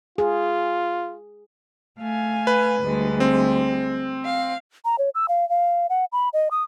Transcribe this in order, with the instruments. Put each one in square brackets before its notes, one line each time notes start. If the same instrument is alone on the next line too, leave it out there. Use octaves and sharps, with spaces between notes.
[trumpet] F4 [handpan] G#4
[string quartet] A3 F5 G#5
[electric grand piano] B4
[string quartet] D2 G3 G#3
[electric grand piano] C4
[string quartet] F5
[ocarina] A#5
C#5
E6
F5
F5
F#5
B5
D#5
D#6